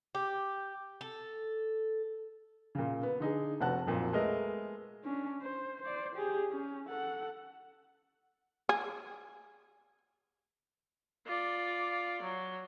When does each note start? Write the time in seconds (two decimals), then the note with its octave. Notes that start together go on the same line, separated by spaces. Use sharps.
0.15 G4
1.01 A4
2.75 A#2 C#3
3.03 B3
3.20 D3 D#4 G#4
3.61 F1 B3 F#4 F#5 A5 F#6
3.87 B1 F2 A#2
4.13 G#3 A3 B3 A#4 D#5
5.04 C#4 D4
5.42 C5
5.82 C5 D5
6.15 G4 G#4
6.50 C#4
6.87 A4 F#5
8.69 G#4
11.26 F4 D5
12.22 F#3